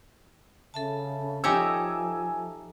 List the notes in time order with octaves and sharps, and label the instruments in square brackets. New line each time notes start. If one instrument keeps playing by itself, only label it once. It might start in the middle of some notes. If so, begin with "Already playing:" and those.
[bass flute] C#3 [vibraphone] A4 E5 A5
[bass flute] F3 [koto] D#4 G4 C#5 [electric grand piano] G#5 E6